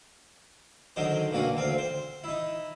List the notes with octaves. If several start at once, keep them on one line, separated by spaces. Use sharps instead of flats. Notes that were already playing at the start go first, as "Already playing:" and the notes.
D3 D#3 F#3 D#4 C5
B1 D3 A#3 F#4 G#5
D2 C4 F5
C5
D#4 E4